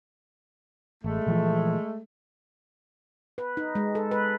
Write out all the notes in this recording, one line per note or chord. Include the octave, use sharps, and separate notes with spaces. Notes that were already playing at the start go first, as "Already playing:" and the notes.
A1 G#3 A3
A#2 E3 F3
B4
D#4
G#3
A4
B4